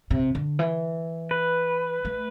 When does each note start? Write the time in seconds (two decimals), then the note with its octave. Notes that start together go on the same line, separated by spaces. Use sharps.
0.10 C3
0.35 D3
0.59 E3
1.31 B4
2.05 A3